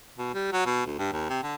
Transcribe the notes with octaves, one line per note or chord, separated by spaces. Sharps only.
B2
G3
F#3
B2
D2
G2
D#2
C3
D3